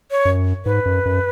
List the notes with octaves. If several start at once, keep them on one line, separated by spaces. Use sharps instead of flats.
C#5
F#2
G#2 B4
F#2
F#2